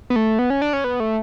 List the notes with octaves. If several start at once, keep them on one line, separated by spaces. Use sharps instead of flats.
B3
A3
B3
C#4
D4
C#4
B3
A3